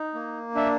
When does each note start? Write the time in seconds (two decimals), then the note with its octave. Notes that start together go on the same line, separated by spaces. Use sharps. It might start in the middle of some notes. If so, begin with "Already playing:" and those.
Already playing: D#4
0.15 A#3
0.55 D4 E5